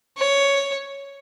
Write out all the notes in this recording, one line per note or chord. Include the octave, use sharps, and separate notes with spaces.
C#5